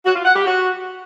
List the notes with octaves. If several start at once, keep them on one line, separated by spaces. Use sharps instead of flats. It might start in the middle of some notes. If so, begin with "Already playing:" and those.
F#4
F4
F#5
G4
F#4